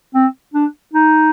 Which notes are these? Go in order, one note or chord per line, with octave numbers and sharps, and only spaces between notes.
C4
D4
D#4